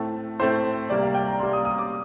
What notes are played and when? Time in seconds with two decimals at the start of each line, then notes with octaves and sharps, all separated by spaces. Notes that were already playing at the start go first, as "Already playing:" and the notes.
Already playing: A2 A3 C4 A5
0.39 A2 A3 C4 C5
0.90 C3 G3 A#3 D5
1.02 F5
1.14 G5
1.27 A#5
1.39 C3 G3 A#3 C6
1.53 D#6
1.65 D#6
1.78 D6